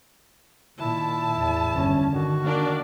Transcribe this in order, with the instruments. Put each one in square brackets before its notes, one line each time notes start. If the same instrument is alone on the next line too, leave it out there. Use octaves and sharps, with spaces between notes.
[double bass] A#2 D#3 [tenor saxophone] E4 [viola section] A5
[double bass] E2 A2
G1 C#4
[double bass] D3 D#3 [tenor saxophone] F#4
[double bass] D#3 [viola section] A#3 D4 D5